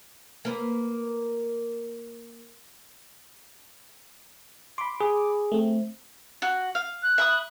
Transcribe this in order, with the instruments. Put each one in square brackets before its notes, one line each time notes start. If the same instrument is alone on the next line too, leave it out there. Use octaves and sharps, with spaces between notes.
[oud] A#3 B4
[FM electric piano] B5 D6 [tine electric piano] C6
[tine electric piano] G#4
[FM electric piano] A3 C4
[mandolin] F#4
F5
[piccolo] F#6
[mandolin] E5 B5 D#6